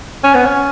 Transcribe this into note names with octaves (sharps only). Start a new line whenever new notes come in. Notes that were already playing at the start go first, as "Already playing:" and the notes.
C#4
B3
C#4